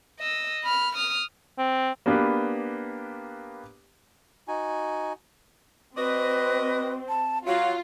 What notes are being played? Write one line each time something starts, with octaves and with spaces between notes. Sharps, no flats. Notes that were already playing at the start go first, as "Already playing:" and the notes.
D#5 E6
B5 F6
D#6 F6
C4
A#3 B3 D4 G4 B4
D#4 F#4 G#5
C4 F#4 B4 D5 D#5
A5
F#3 F4 F5